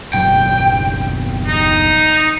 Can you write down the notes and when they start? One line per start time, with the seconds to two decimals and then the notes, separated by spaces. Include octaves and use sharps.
0.13 F#1 B2 F#3 G5
1.47 D#4